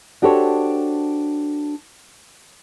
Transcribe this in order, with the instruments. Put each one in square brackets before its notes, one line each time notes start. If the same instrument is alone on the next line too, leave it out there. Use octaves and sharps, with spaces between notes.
[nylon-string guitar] D4 F#4 G4 A4 C5 C#5